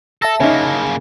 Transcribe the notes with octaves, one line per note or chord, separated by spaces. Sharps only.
A4 E5 A5 A#6
C#3 A#3 C#4 D#4